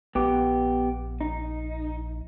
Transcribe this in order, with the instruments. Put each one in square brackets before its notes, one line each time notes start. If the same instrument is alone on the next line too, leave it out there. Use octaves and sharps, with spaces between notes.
[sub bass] A#1 [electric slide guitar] B3 G4
[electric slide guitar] D#4